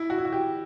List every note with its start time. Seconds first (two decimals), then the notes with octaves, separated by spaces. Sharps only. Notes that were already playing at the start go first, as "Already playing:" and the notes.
Already playing: E4
0.10 F#4
0.18 E4
0.25 F#4
0.32 G4